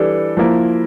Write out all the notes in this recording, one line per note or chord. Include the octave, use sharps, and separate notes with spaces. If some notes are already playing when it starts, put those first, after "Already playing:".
Already playing: E3 G3 D4 A4
F3 A#3 E4